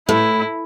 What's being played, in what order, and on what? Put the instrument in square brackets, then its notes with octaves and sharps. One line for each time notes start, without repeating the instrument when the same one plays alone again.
[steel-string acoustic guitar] A2 [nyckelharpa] E4